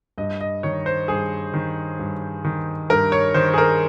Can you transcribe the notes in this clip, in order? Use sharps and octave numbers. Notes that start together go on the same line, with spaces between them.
G2 D#5
D#5
D#3 C#5
C5
G2 G#4
D#3
G2
D#3
G2 A#4
C#5
D#3 C5
G#4
A#4